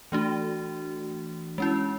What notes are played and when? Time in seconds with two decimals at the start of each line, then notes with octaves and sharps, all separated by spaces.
0.12 E3 A3 D4 F#4
1.58 G#3 C#4 E4